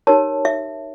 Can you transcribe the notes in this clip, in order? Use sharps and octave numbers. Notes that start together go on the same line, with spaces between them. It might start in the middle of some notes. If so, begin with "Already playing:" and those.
D#4 G4 A#4 C#5 A5
E5